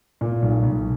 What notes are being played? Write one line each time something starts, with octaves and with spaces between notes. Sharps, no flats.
A#2
B1
B1